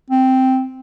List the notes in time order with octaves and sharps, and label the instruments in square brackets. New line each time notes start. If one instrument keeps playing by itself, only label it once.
[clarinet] C4